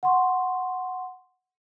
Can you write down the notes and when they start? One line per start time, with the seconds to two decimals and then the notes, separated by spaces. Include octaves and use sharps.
0.03 F#5 C6 C#6